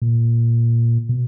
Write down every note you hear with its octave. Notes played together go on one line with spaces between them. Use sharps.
A#2
B2